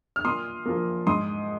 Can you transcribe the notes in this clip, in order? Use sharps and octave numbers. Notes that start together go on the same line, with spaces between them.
F6
A#2 C6 D#6
F3 A#3
G#2 C6 D#6